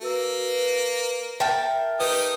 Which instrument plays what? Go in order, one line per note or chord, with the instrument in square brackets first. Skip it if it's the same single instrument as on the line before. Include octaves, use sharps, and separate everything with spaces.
[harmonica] A#3 [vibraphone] F#4 B4 E6
[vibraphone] B4
[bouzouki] A#4 G5 A5 [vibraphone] E5
[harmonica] D#4 G4 D#6 [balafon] B4